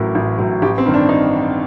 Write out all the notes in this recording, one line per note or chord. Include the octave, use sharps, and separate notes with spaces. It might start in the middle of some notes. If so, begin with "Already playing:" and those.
Already playing: A1 A2 F#3 A#4
A1
A2 F#3
A1 G4
C4
G2 D#3
D4
D#4